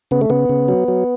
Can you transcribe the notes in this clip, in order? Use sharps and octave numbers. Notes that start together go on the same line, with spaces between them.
C#3 B3
A3
C#3 B3
C#3
F#3
F#3